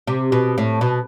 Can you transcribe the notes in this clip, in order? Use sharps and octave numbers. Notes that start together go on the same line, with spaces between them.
C3
B2
A2
B2